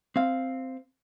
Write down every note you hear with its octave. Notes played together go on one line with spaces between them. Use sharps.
C4 F5